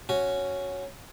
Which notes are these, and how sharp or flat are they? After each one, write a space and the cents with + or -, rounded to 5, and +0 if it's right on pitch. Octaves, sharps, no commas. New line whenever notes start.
C#4 +0 F#4 +0